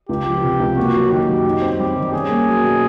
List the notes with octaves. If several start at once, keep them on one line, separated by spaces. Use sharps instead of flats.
C#2 G4
F3
C3
C#2
A#3 F#4
F#3
D#3 G4
F#2
D#4
C4
G3 G4
D#3
C#4 G#4
A#3
F#3
B2